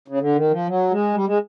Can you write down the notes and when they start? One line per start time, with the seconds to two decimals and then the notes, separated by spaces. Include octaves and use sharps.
0.08 C#3
0.20 D3
0.35 D#3
0.51 F3
0.67 F#3
0.91 G#3
1.14 G3
1.27 G#3